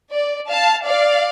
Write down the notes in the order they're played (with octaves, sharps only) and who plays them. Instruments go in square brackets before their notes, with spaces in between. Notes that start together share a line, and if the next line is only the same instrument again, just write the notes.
[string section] D5
F5 A5
D5 F5